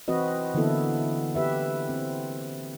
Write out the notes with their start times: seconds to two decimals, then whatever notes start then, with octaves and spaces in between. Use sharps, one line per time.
0.08 E3 C4 F#4 B4 D#5
0.54 D3 E3 A#3 B3 E4 A4
1.35 G4 B4 E5
1.89 C4